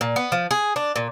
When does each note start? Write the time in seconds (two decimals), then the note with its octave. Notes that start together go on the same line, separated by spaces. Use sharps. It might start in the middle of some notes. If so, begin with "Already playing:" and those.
0.01 A#2
0.16 B3
0.32 F3
0.51 G#4
0.76 D4
0.96 A#2